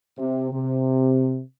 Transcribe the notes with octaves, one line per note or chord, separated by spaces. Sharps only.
C3
C3